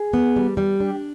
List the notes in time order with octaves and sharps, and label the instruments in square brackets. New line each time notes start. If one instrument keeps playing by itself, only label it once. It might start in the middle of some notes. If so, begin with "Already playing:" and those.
Already playing: [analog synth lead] G#4
[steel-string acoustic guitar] B3
G3
G3
[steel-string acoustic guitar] D4 [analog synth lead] G4